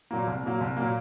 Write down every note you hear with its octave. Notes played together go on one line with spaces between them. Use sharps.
A#2 F#3 A#3
C2
A#2 F#3 A#3
C2
A#2 F#3 A#3